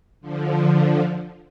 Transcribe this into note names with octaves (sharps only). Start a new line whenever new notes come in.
D3 F3